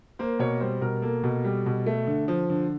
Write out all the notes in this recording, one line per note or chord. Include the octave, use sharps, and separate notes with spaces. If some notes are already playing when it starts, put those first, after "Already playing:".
A#3 C5
B2 C#5
G3 C5
B2 A#4
A#3 A4
B2
G3
B2
A3
D3
F3
D3